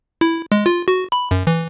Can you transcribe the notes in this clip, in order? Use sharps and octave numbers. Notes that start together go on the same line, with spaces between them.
E4
G#3
F4
F#4
B5
F#2
E3